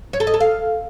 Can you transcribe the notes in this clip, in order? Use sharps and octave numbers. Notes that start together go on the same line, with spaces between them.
C#5
A4
D#5
A4
F5